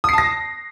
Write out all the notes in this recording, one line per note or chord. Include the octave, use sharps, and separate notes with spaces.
A5 D#6 A#6 C7